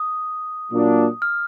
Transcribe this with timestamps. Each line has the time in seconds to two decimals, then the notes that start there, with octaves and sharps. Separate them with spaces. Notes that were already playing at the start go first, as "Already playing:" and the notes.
Already playing: D#6
0.70 A#2 F#3 A#3 D4 F4
1.22 F6